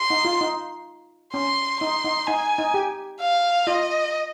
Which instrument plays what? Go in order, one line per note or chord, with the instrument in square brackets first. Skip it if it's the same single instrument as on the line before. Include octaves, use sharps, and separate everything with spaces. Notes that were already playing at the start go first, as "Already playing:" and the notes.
Already playing: [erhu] C6
[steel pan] D#4
F4
D#4
[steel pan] C#4 [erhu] C6
[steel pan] D#4 [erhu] C6
[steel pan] D#4
[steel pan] D#4 [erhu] G#5
[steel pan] D#4
G4
[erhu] F5
[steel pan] F4 [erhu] D#5